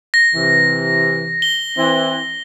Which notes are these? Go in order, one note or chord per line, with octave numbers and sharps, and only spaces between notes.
A#6
C3 E3
G7
E3 C4